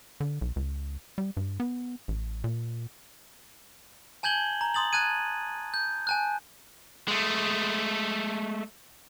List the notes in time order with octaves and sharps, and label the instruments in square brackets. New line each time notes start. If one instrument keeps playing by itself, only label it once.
[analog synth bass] D3
B1
C#2
G3
G2
B3
A1
A#2
[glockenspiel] G#5 A5 G6 G#6 F#7 G7
A#5
C6 D#6 A6 F#7
A5 F#6 G#6 D#7
G6
G#5 A5 F#6
[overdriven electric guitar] G#3 A3